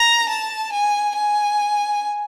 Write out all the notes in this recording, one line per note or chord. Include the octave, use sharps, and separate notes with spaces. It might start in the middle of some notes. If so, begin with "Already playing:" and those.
Already playing: A#5
A5
G#5
G#5